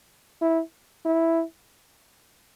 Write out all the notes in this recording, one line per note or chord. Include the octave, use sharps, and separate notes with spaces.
E4
E4